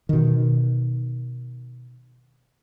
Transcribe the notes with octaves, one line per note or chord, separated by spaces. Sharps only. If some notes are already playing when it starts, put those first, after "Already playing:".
B2 D#3